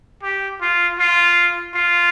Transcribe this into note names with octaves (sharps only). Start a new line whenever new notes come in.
G4
F4
F4
F4